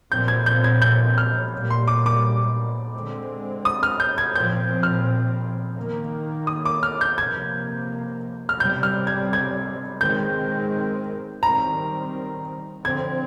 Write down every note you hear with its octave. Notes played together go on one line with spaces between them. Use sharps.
A#2 F3 C4 G6
G#6
G6
G#6
G6
F6
A#2 G3 A#3
C6
D6
D6
D3 G#3 C4
D#6
F6
G6
G#6
A#2 F3 C4 G6
F6
D#3 A#3
D#6
D6
F6
G6
C3 F3 A#3 G#6
F6
C3 G3 C4 G6
F6
G#6
G#6
D#3 G#3 C4 G6
D#3 G3 C4 A#5
D3 F3 C4 G#6